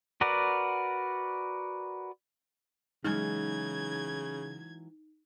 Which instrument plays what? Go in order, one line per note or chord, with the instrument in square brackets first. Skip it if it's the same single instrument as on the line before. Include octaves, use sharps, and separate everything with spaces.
[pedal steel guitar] F#4 A#4 B4 D5 F#5
[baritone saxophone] C#3 [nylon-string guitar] E3 F#3 G#3 [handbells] D#4 [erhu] G#6